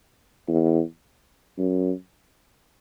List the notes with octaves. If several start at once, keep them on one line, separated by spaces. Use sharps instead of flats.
E2
F#2